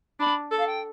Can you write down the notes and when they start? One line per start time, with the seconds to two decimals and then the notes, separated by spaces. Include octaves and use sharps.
0.20 D4 B5
0.51 A4
0.58 F5
0.67 G5